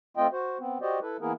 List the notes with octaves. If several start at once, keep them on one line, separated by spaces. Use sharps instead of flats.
A3 C4 F4 D#5 G5
F#4 C5
B3 C4
F#4 G4 C5 D5 D#5
E4 A4 B4
E3 A#3 B3 E4 G#4 A#4